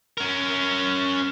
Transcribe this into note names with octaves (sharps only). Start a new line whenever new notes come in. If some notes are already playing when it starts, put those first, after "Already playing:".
C#4 A#4